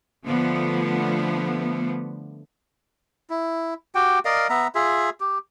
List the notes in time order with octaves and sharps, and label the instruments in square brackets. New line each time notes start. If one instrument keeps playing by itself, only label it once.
[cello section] D3 F3 A3 B3
[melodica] E4
F#4 G4 G5
A#4 D5 D#5 F5
B3 E5 A#5
F4 G#4 E5
G4